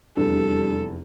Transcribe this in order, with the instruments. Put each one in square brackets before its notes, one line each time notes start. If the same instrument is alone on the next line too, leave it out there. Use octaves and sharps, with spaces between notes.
[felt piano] F1 E2 [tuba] G3 [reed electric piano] D4 [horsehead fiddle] A4